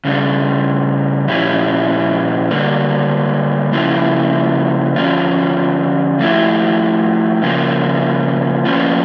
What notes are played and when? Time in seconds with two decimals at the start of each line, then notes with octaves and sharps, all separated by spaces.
0.05 C#3 G3 D4
1.28 A#2 F3 C#4 E4 G4
2.51 D3 G3 A#3
3.73 C#3 F3 A#3 E4 G4
4.96 D3 F3 C#4 F4
6.19 F3 A3 E4 G4
7.43 C#3 F3 A#3
8.65 F3 A#3 C#4 F4